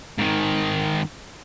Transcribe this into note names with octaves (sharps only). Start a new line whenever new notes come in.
G#2 D#3